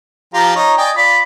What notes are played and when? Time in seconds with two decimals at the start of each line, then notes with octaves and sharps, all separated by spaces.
0.34 F3 F4 G4 A#5
0.56 D#4 C#5 D#5
0.77 D5 D#5 G5 G#5
0.96 F4 D5 B5